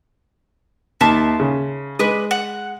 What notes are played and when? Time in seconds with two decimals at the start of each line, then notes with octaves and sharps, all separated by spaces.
1.01 D#2 E5 A5 C6
1.39 C#3
1.99 G#3 D4 B4 D#5
2.31 F#5